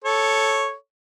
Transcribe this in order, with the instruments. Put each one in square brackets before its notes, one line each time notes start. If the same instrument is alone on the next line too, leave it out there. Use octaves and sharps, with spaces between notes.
[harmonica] A4 C#5